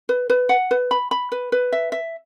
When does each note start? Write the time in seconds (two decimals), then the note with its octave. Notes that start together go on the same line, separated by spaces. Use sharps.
0.09 B4
0.30 B4
0.49 F#5
0.71 B4
0.91 B5
1.11 B5
1.32 B4
1.52 B4
1.72 E5
1.92 E5